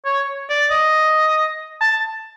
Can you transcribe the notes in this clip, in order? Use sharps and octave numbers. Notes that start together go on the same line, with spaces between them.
C#5
D5
D#5
A5